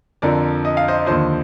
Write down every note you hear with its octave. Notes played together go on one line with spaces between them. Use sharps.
F2 D3 F3 A#4 D5
D#5
F5
C5 D#5
D#2 D3 F3 C5 D#5